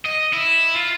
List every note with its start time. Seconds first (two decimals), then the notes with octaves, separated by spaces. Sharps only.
0.06 D#5
0.33 E4
0.75 F4